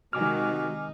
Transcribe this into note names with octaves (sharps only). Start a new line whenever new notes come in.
C3 D#3 G#3 D#4 F#4 G#5 D6 F6